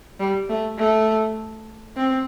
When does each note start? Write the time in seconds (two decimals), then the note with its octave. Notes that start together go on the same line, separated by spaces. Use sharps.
0.20 G3
0.49 A3
0.78 A3
1.96 C4